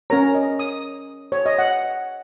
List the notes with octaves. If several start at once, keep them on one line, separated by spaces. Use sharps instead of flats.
C#4 A#4 C#5 A#5
D#5
D#6
C#5
D#5
F#5